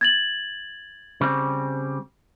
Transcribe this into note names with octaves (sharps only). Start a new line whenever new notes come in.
G#6 A6 F#7
C#3 G3 C4